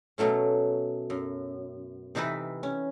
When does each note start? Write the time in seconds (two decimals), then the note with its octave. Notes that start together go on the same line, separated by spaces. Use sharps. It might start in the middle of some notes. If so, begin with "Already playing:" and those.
0.18 B2 F#3 A3 C#4
1.10 F#2
2.15 C3 E3 D#4 E4 B4
2.63 C#4